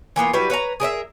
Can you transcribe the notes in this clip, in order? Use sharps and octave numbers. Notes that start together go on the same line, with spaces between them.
E3 A#3 B3 F4
F#3 G3 E4 B4
B4 C#5 F5 A#5
G#4 A#4 D#5 E5